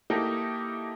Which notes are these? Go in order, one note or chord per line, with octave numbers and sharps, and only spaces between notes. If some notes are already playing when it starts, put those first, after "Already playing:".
A#3 D#4 E4 G4 A4